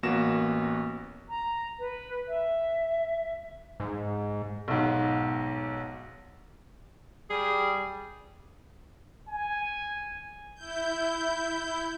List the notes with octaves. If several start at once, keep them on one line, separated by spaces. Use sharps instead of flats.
A1 A#3 B3 F#4 A#6 E7
A#5
B4
E5
G#2
B1 G#2
G3 G#4
G#5
E4 G6